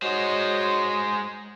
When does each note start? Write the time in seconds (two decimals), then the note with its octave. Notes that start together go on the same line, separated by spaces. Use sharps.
0.02 G#3 F#4 C5 C#5 D#5